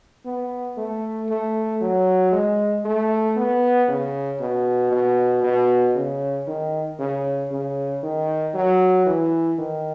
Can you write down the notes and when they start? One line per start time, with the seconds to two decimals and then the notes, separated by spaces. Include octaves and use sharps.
0.25 B3
0.77 A3
1.29 A3
1.81 F#3
2.32 G#3
2.85 A3
3.36 B3
3.88 C#3
4.40 B2
4.92 B2
5.44 B2
5.95 C#3
6.48 D#3
6.99 C#3
7.51 C#3
8.03 D#3
8.55 F#3
9.06 E3
9.58 D#3